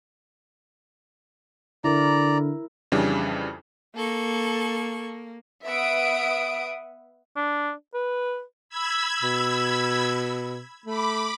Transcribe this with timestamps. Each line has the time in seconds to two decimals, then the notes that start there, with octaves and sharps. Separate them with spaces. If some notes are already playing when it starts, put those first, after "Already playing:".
1.84 D3 E4 A#4 D5 A#5
2.92 F2 C#3 E3 G3 D4
3.96 A#3 A4 C#6
5.65 B3 E5 F#5 D#6 D7
7.36 D4
7.94 B4
8.69 B5 E6 G#6
9.22 B2
10.86 A3 B5 D6